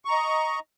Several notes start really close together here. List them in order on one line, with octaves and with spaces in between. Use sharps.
C#6 A#5 D#5